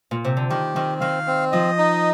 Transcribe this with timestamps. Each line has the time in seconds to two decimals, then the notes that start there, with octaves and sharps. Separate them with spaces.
0.11 A#2
0.24 C3
0.37 D3
0.50 D#3 G4
0.75 D#3 C4
1.01 D#3 F5
1.27 C4
1.52 F3 D#5
1.78 D#4